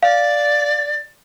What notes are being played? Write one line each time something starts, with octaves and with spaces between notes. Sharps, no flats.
D5 F5